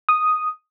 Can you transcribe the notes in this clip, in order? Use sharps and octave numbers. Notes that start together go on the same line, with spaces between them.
D#6